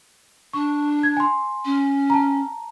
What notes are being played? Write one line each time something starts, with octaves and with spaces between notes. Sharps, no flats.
D4 C#6
G#6
G#5 C6
C#4
A5 A#5